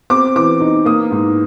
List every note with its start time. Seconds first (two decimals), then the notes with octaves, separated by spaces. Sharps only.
0.10 C4 D6
0.36 E3 D6
0.60 D#4
0.85 A#3 D#6
1.11 G#2